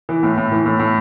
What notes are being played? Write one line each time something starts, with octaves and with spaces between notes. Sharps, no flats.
E3
A2
A2
E3
A2
A2